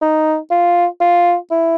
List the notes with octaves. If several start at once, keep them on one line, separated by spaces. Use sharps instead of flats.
D#4
F4
F4
E4